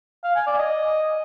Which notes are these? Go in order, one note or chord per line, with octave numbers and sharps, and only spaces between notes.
F5
G#5
D5
D#5